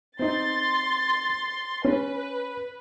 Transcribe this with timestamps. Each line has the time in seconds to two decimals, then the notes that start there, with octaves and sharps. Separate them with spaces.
0.19 C4 D#4 C6 A6
1.84 C#4 B4